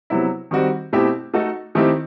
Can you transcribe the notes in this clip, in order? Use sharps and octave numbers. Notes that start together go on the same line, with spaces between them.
C3 F#3 B3 E4
D#3 G3 C4 F#4
B2 A3 C4 E4 G4
A3 D#4 F#4 A4
D#3 A3 C4 E4 G4